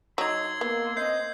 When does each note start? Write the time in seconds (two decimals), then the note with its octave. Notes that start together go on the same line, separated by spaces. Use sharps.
0.18 F#3 D#4 C6 E6 G#6
0.61 A#3 B3
0.97 C4 C#4 D#5 G6 C7